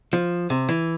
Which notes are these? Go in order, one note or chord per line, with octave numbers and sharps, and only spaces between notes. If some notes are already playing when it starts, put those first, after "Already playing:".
F3
C3
E3